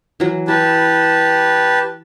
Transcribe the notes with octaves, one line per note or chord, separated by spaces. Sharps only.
E3 F#3
E4 G4 B4 A5